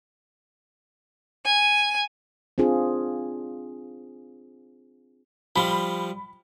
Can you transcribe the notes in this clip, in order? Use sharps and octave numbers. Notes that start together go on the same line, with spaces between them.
G#5
C4 D4 F4 G#4
F3 G3 B5